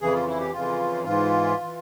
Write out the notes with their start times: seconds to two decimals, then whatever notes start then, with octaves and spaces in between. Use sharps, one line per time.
0.01 F2 C#3 E3 G#4
0.13 F4
0.27 E4
0.40 G4
0.52 F2 C#3 E3 F4
1.04 G#2 E3 F4
1.61 E3